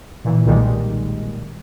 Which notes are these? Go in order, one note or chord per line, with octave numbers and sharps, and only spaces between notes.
A#2 E3
B1 A#2 D#3 G3 G#3